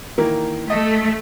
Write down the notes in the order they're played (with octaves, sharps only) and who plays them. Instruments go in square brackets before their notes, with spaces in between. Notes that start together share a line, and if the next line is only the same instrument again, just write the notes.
[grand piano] D#3 E3 A#3
[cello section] A3 [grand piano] D#5